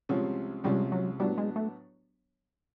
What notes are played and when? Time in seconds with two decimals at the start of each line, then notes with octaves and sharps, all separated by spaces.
0.09 C2 C3 F3 G#3 C#4
0.64 C2 C3 F3 G3 G#3 C#4
0.92 F#3
1.20 A2 F#3 G3 B3 D4
1.38 G#3
1.56 A3